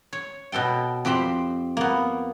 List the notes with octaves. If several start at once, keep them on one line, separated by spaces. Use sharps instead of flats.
C#5
B2 B3 A4 G5
F2 G4 C5 B5
A#3 B3